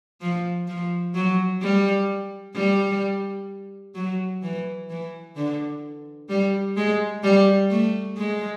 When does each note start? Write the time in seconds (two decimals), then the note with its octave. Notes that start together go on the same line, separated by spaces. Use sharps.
0.21 F3
0.68 F3
1.14 F#3
1.62 G3
2.55 G3
3.95 F#3
4.43 E3
4.90 E3
5.36 D3
6.29 G3
6.76 G#3
7.23 G3
7.70 A3
8.17 G#3